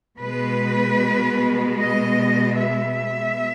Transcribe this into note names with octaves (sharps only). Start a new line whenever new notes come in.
B2 G#3 B3 B4
D#5
E5